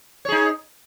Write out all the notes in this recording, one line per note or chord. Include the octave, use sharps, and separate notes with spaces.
D#4 G#4 C#5